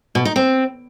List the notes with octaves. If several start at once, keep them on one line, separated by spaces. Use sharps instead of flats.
B2
D#4
C4